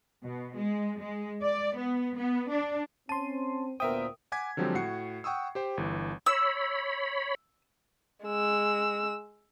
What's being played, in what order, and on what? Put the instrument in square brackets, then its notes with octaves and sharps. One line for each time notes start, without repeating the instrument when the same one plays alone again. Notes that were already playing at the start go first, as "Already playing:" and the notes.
[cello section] B2
G#3
G#3
D5
B3
B3
D4
[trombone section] C4 [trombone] C#4 [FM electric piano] A5 C6 [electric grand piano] D#7
[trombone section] D2 A#2 B3 [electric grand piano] A#4 E5 G5 [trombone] C5 [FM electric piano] D#6
[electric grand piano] F#5 G#5 D6 G#6 B6
D3 F3 F#3 G#3 C4 G4
A2 F#4 F#5 C7 C#7
F#5 G5 C#6 D#6 E6
G4 C5 G5
G1 E3
[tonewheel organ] C#5 B5 [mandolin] E6
[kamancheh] G#3 E6